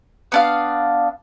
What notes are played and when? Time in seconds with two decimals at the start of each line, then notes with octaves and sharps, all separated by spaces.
0.32 B3 D4 F5